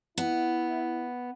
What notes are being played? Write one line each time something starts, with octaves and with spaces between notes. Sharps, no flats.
B3 E4